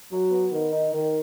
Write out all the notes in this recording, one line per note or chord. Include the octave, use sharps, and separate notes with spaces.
F#3
B3
D#3
D#4
D#3